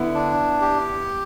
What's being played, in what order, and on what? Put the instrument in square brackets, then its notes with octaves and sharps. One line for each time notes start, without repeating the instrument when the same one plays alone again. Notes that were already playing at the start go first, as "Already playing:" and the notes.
Already playing: [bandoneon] D3 [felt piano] B3 E4
[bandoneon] D4
G4